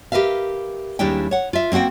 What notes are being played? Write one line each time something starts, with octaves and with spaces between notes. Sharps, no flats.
G4 A#4 B4 E5 F5
D#2 G3 G#3 D4 E4 G5
C#5 F#5
F4 E5
A#3 C4 F#4 F#5 G5